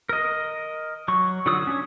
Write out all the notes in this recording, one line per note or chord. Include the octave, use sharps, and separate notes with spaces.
A#4 D#5
F#3 C#6
D3 F#3 F4 D#6 E6
C#4 D4 C#5